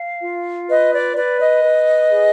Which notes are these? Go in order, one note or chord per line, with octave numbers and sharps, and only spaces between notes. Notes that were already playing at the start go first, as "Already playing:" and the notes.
Already playing: F5
F4
B4 D#5
D5
B4 D5
D#5
B4
G#4